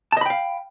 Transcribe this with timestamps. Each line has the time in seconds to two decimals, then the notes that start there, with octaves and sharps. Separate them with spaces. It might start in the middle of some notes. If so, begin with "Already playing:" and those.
0.12 A5
0.17 D#5
0.21 B5
0.26 G5
0.30 F5